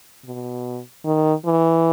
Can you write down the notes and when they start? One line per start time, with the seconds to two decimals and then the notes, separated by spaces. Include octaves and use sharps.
0.25 B2
1.06 D#3
1.46 E3